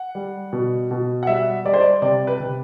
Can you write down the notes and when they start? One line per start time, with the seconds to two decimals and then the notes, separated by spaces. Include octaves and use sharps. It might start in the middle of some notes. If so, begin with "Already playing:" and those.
Already playing: F#5
0.15 G3
0.53 B2
0.91 B2
1.23 F#5
1.27 G3 E5
1.65 G3 D5
1.74 C5
1.80 D5
2.02 C3 D5
2.27 B4
2.40 C3